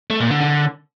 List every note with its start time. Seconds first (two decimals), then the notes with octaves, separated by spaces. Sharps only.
0.10 A3
0.20 A#2
0.31 D3
0.41 D3